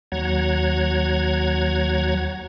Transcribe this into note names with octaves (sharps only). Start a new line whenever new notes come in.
D#2 F#3 F#5 A#5 G#6